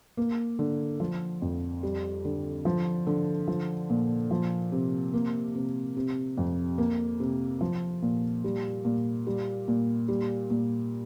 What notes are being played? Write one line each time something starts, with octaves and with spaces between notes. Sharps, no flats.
A#3
D3
F3
F2
G3
D3
F3
D3
F3
A#2
F3
C3
A#3
C3
C3
F2
A#3
C3
F3
A#2
G3
A#2
G3
A#2
G3
A#2